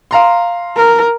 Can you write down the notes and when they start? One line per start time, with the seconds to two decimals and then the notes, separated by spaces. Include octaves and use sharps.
0.11 F5 A#5 C6
0.77 A#4